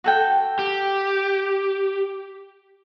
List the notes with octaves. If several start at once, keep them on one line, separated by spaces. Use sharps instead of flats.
F#4 A4 G5
G4